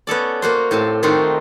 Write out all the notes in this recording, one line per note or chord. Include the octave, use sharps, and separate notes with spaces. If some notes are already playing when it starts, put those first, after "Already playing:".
B3 C#4 A4 D5
A#3 F#4 C5
A2 C4 G4 A5
D#3 A3 C4 D#4 F4 F#4